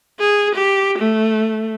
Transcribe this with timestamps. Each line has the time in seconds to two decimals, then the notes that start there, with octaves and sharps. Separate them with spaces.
0.19 G#4
0.54 G4
0.98 A3